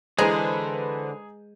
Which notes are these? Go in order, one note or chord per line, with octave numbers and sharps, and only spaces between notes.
D3 E3 G#3 G#4 B4 C5 G#5 A#5